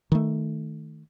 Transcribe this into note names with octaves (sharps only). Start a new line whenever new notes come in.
D#3 A3